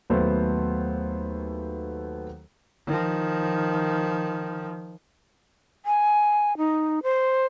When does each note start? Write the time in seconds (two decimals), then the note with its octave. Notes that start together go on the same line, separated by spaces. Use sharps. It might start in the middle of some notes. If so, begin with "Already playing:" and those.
0.10 D#2 F#3 A3 B3 A4 C5
2.87 D#3 F3
5.85 G#5
6.57 D#4
7.03 C5